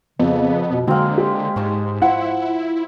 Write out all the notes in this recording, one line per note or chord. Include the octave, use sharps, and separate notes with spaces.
F2 C#3 B3
B2
D3 F#3 G#3 A#3 C4
G4
G#2 C#5 A5 D#6
F3 E4 F#5